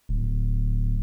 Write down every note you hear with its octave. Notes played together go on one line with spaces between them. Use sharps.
D1